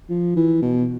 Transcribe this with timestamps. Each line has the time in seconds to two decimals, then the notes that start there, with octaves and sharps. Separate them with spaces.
0.09 F3
0.36 E3
0.62 B2